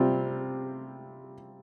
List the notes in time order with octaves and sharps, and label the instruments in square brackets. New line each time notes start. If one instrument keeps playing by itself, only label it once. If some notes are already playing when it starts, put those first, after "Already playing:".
Already playing: [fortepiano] C3 G3 C4 F4